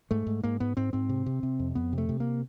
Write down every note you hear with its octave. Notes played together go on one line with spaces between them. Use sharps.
G#2 A3
G#2
G#2 A#3
G#2 B3
G#2 C4
G#2 C4
C3
C3
C3
F2
F2 B3
C3
A3
C3
A#3